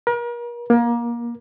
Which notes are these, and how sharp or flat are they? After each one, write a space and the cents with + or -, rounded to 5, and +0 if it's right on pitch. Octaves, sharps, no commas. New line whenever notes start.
A#4 +40
A#3 +25